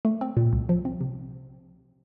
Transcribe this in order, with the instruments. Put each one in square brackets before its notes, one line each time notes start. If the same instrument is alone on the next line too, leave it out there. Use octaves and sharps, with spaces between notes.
[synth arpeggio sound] A3
C4
A#2
C2
F3
C4
C3